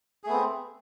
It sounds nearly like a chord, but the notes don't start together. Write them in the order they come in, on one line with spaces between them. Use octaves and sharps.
G#4 A3 B3 C4